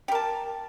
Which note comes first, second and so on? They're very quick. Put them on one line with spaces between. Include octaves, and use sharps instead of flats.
G4 A#4 A5